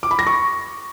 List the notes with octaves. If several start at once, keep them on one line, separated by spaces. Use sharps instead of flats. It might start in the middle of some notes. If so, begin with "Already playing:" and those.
D6
B5
A#6
C#6